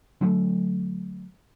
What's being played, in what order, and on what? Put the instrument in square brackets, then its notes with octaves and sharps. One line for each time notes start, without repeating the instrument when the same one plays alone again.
[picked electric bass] D3 F#3 G3 A3